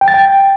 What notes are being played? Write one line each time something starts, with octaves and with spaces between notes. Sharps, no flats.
G5
A6
G5